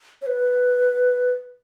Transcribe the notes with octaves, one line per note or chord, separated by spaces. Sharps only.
C#5
B4